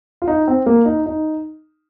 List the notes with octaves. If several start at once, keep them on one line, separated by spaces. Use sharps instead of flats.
F4
D#4
C4
A#3
D#4
D#4